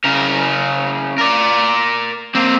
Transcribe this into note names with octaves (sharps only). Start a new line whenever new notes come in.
C#3 A#4
A#4 D5
A#3 C4